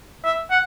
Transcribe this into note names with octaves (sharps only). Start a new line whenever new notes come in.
E5
F#5